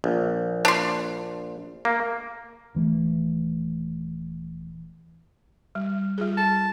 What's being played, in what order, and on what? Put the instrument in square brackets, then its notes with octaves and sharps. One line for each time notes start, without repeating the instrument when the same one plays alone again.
[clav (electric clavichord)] A#1
[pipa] D4 C6
[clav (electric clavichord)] A#3
[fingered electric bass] D#1 E3 A3
[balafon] G3
G3 F4 G#4
[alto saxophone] A5